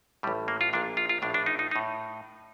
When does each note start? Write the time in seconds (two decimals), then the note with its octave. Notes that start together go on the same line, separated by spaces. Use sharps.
0.23 A1 A2 G3
0.48 A#3
0.61 F4
0.73 A#1 A#2 D4
0.97 F4
1.09 F4
1.22 A#1 A2 D4
1.34 D4
1.46 D#4
1.59 D#4
1.71 D#4
1.76 A2